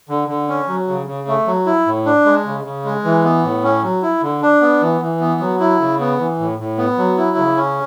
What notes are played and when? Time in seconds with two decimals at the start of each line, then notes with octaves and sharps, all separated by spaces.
0.09 D3
0.28 D3
0.48 C#4
0.68 F#3
0.88 C#3
1.07 C#3
1.27 A3
1.47 F#3
1.66 E4
1.86 A2
2.05 D4
2.25 G#3
2.45 C#3
2.65 C#3
2.84 G#3
3.04 E3
3.24 B3
3.43 A2
3.64 C#4
3.83 F#3
4.03 E4
4.22 D3
4.42 D4
4.61 B3
4.82 E3
5.01 E3
5.20 B3
5.40 F#3
5.60 E4
5.79 C#3
5.99 B3
6.19 E3
6.39 A2
6.58 A2
6.78 B3
6.98 F#3
7.17 E4
7.37 C#3
7.57 C#4